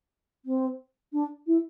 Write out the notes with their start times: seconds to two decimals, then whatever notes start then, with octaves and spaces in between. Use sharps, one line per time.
0.45 C4
1.12 D4
1.46 E4